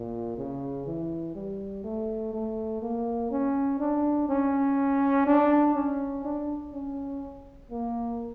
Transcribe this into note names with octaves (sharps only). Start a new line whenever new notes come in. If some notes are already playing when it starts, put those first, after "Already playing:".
Already playing: A#2
C#3
E3
G3
A3
A3
A#3
C#4
D4
C#4
D4
C#4
D4
C#4
A#3